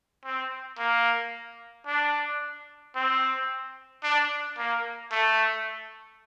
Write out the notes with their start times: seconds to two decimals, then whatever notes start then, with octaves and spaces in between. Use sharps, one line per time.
0.25 C4
0.78 A#3
1.87 D4
2.95 C4
4.03 D4
4.58 A#3
5.12 A3